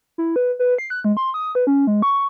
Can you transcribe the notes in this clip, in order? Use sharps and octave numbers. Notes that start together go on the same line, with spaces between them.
E4
B4
B4
C7
F#6
G#3
C6
D#6
B4
C#4
G#3
C#6